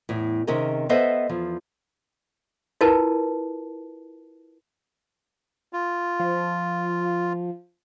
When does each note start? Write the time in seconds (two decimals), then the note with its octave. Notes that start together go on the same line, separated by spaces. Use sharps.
0.09 E2 A2
0.47 C3 D#3 C#4 G#4 A#4 D#5
0.89 B3 A4 B4 C5 D#5 E5
1.29 E2 F3
2.81 E4 F4 A#4 B4 A5
5.73 F4
6.19 F3